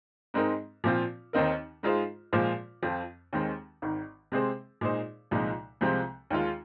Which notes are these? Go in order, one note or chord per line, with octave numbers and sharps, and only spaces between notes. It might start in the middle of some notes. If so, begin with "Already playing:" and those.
G#2 G#3 C4 D#4 A#4
A#2 F3 C4 F4
D#2 D#3 C4 D#4 A#4
G#2 G#3 F4 G#4 C5
A#2 F3 G#3 F4 C5
F2 F3 C4
D#2 D#3 G#3 C4
G#1 G#2 D#3
C3 G#3 C4 G#4 C5
A#2 G#3 D#4 G#4 C5
C2 A#2 F3 G#3 D#4
C2 C3 F3 G#3 C4
D#2 D#3 G#3 F4